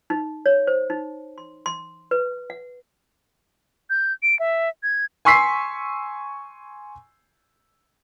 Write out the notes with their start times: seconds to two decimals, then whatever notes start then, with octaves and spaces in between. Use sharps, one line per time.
0.10 D#4
0.46 C#5
0.67 C5
0.90 D#4
1.38 C6
1.66 C6
2.11 B4
2.50 F#5
3.90 G6
4.23 D7
4.39 E5
4.83 G#6
5.25 G#5 C6 C#6 E6 B6 C7